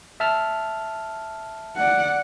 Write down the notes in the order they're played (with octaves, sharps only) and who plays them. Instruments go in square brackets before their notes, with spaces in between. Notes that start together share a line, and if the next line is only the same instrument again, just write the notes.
[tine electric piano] E5 A5 F6
[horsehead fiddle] D5 F#5